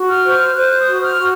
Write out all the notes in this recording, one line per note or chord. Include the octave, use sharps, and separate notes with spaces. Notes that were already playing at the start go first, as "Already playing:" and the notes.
Already playing: F#4
F6
C5
C5 F#6
D#6
F#4
F6
F#4